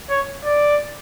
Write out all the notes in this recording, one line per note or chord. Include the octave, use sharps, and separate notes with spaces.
C#5
D5